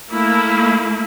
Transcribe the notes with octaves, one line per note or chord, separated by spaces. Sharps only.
A3 A#3 E4